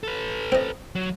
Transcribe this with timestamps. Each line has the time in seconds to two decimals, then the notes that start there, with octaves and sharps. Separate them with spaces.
0.03 A4 B4
0.52 C4 D#5
0.95 F#3